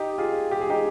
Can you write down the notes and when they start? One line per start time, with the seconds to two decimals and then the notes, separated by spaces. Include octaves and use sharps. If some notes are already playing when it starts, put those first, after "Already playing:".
Already playing: D#4 G4
0.18 F4 G#4
0.51 G4
0.61 G#4
0.70 D#4 G4